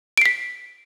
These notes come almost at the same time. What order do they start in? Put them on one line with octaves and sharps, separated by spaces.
D7 C7 B6